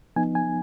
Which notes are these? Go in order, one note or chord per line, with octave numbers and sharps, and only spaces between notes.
F3 B3 D#4 G#5
G#5